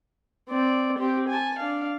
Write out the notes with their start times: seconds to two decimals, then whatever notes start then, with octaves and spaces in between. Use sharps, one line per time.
0.50 C4 D5
0.99 C4 G4
1.29 G#5 A5
1.59 D4 F5